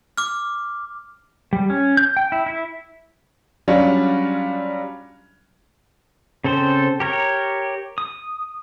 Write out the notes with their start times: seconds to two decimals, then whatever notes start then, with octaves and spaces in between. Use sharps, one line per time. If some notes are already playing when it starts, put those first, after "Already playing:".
0.18 D6 F6
1.53 G3
1.70 C#4
1.97 G6
2.17 G5
2.32 E4
2.46 E4
3.68 F#3 G3 C#4 D4 F4
6.44 C#3 C4 A4 C5
7.00 G4 A#4 C#5
7.98 D#6